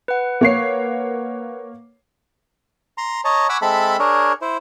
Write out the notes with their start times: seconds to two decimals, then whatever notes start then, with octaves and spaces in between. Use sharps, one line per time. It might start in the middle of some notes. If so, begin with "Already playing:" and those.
0.08 B4 F#5
0.41 A#3 C#5 C7
2.98 A#5 C6
3.25 C#5 D#5 A5 A#5
3.49 F#5 G#5 B5 C#6 D6 E6
3.62 G#3 C4 A4 E5 A5 B5
3.99 D4 G#4 A#4 C#5
4.42 E4 C5